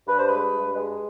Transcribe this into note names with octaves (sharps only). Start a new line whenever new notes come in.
G2 B4
C5
G#3 B4
G2
G#3